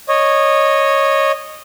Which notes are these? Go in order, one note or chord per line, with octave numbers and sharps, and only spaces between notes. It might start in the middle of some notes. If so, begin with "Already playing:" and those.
C#5 D#5